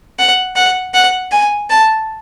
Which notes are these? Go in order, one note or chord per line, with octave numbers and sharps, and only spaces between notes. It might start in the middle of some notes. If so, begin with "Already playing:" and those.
F#5
F#5
F#5
G#5
A5